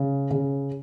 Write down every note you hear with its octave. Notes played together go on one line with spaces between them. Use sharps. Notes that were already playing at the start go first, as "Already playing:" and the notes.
Already playing: C#3
C#3